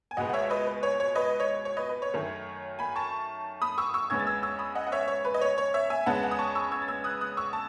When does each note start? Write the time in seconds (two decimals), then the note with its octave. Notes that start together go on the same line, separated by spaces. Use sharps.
0.11 G#5
0.17 C#2 B2 G#3 B3 D#5 F#5
0.29 F#5
0.34 C#5 E5
0.50 B4 D#5
0.67 B4
0.83 C#5
1.00 C#5
1.16 B4 D#5
1.40 C#5
1.65 C#5
1.77 B4 D#5
1.89 B4
2.02 C#5
2.14 F#2 D#3 A3
2.79 G#5 B5
2.96 A5 C#6
3.62 B5 D#6
3.78 C#6 E6
3.94 C#6 E6
4.10 E2 C#3 G#3 B3 E6 G#6
4.19 A6
4.26 E6 G#6
4.43 C#6 E6
4.59 B5 D#6
4.75 D#5 F#5
4.87 F#5
4.92 C#5 E5
5.08 C#5
5.25 B4
5.34 D#5
5.41 C#5
5.58 C#5
5.74 C#5 E5
5.90 E5 G#5
6.06 E2 C#3 G#3 B3 F#5 A5
6.23 F#5 A5
6.31 D#6
6.39 A5 C#6
6.55 C#6 E6
6.72 E6 G#6
6.82 A6
6.88 E6 G#6
7.04 D#6 F#6
7.21 D#6 F#6
7.37 C#6 E6
7.53 A5